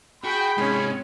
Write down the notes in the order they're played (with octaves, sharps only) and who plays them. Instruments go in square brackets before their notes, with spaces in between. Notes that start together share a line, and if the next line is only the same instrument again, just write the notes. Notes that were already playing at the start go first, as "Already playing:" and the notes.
[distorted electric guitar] F#4 [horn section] G#4 B5 [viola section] G5
[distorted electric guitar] G#2 C3 [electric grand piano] G#3 [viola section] C#4